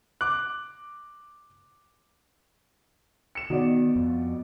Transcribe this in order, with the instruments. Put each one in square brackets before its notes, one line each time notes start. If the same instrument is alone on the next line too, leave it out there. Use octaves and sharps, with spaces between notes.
[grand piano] D6 F#6
[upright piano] C#7 E7
[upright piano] B2 F#4 D5 [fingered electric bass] D#3
[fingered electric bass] F2